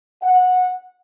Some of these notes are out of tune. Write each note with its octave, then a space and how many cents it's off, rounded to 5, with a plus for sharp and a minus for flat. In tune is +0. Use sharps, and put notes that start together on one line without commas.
F#5 -20